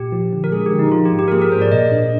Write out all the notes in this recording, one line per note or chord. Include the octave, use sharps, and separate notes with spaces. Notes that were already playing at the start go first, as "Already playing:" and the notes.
Already playing: A#2 G4
F3
D3
A#4
G#3 G#4
G4
D3
D#4
F3 F4
G4
G#2
G4
A#4
A#3 G#4
A#4
G#2 C5
D5
A#2 D#5
D4